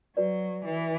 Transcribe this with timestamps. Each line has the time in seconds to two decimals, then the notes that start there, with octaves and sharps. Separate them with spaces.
0.16 F#3 F#4 B4 D5
0.65 E3